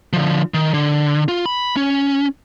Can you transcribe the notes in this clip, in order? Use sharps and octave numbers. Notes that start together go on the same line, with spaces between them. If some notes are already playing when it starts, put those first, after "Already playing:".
D3 F3
D#3
D3
F4
B5
C#4